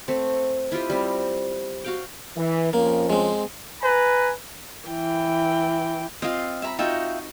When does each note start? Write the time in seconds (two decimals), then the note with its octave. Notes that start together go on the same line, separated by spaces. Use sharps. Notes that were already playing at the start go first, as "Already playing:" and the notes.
0.08 A3 C4
0.72 E4 F4 G4 D#5
0.90 G3 C4
1.84 F#4 F5 G5
2.37 E3
2.73 F2 F3 A#3 C#4
3.10 G#3 C4
3.82 B4 G#5 A#5
4.88 E3 G5
6.22 C4 F4 D#5 F5
6.62 E5 A#5 B5
6.79 D#4 F4 F#4 E5 F#5 G5